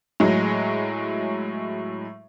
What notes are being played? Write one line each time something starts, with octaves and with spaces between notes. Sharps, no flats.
A2 F#3 G#3